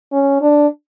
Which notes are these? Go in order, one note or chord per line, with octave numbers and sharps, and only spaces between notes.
C#4
D4